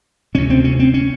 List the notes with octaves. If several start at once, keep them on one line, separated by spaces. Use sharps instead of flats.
D2 C3 C#4
C4
C#4
C4
C#4